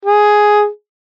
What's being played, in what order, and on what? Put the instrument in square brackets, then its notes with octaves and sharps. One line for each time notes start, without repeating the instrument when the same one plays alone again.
[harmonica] G#4